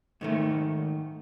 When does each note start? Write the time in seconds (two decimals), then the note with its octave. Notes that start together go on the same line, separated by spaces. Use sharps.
0.21 G#2 D#3 A3